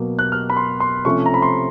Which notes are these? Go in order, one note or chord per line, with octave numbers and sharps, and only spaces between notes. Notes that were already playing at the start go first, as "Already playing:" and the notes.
Already playing: B2 F#3 A#3
F#6
F6
B5
C6
C6
C3 F3 A3 C#4 C#6
A#5
B5
C6